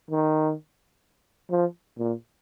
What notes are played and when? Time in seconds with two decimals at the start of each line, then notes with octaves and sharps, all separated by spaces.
0.11 D#3
1.50 F3
1.98 A#2